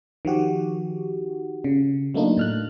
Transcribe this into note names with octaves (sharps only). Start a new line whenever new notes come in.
D#3 F3 F#4 G4
C#3
F#3 A3 A#3 D4 D#4 F4
A2 F6 F#6